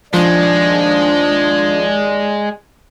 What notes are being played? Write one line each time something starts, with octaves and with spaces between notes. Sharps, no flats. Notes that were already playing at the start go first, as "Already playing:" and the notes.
D#2 F3 G#3 D4 D5